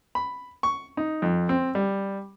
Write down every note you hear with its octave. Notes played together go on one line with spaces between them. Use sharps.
B5
C#6
D#4
F2
C4
G3